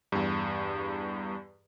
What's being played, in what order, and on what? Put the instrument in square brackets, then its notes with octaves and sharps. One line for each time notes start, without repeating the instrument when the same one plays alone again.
[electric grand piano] E2 G2